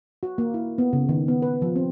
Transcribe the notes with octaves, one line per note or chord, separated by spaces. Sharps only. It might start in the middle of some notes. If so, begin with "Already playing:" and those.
F#4
A#3
E4
B3
C#3
D#3
B3
B4
F3
C4